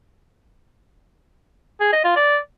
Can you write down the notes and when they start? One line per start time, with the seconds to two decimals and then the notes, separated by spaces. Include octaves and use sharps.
1.81 G#4
1.93 D#5
2.05 F4
2.16 D5